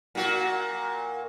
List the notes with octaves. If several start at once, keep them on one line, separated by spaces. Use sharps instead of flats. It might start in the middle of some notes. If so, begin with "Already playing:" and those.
A#2 F#4